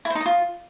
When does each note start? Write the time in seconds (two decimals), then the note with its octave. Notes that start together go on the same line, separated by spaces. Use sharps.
0.05 E4
0.10 C5
0.15 D#4
0.20 D#5
0.26 F4